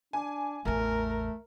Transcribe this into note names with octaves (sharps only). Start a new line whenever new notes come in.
D4 G#5
A1 E2 A3 A#4